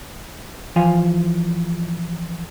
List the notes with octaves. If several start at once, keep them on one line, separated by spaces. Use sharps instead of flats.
E3 F3 F4 F5 G#5